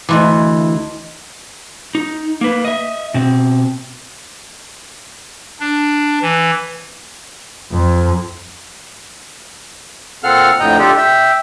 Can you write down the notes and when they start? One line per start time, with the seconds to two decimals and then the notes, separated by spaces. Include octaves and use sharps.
0.09 D2 G2 E3 D#5 C6 D6
1.95 D#4
2.41 A#3 B4
2.65 D#5 E5
3.14 B2 C4
5.60 D4
6.22 E3
7.72 F2
10.24 A#2 C4 A4 F5 F#5 F6
10.60 F2 A2 D3 D#5 G5 A#5
10.79 D4 F4 G4 A4 D5
10.97 E5 G5